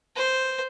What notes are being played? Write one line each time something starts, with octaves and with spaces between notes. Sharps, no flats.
C5